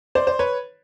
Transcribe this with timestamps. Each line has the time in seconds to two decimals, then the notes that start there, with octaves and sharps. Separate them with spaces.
0.15 C5 D5
0.27 C5
0.39 B4 C#5